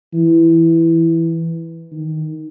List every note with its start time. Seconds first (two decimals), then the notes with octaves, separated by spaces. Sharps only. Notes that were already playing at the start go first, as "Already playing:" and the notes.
0.14 E3
1.92 D#3